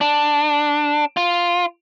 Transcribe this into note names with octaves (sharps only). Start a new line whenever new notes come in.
D4
F4